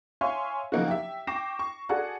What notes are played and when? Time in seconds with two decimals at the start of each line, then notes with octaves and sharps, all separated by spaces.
0.21 C#5 E5 F5 G#5 C6 C#6
0.72 C#3 F3 F#3 A#3 D#4 F#4
0.87 G4 E5
1.27 G5 C#6 D6 A#6 C7 E7
1.59 C#6
1.89 F#4 G#4 A4 D5 F#5